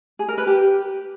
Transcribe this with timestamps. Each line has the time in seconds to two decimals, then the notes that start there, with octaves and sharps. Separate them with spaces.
0.19 G#4
0.28 A#4
0.38 B4
0.47 G4